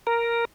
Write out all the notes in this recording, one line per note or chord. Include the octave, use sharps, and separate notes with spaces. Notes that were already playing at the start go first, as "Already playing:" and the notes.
A#4